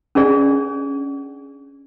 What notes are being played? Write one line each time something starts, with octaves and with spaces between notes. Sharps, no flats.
C#4 D4 G#4 D5